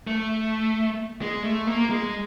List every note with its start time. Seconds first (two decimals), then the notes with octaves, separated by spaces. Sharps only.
0.07 A3
1.22 G#3
1.44 A3
1.67 A#3
1.90 G#3